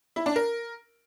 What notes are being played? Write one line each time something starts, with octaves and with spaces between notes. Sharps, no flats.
E4
D4
A#4